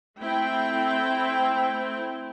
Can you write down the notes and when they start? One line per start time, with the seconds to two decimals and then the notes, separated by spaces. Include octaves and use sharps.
0.20 A3 C4 E4 G5